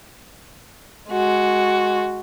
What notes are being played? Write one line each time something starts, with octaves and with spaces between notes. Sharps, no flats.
G#3 F#4